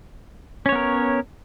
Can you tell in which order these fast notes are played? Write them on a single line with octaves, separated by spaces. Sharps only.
C#4 C#5 B3 A#4